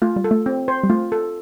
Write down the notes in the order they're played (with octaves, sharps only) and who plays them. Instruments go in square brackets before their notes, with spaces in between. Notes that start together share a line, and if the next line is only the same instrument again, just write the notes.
[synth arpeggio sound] A3 [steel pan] F4
[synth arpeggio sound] G3
[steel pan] A4
[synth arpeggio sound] A3
[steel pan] C4
C5
[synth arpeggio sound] G3
[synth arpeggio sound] A3 [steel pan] F4
[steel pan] A4